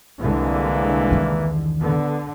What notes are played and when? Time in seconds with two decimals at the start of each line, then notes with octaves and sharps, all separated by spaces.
0.21 C2 D3 E3 G#3 A#3
1.11 E2 D#3
1.81 D3 B3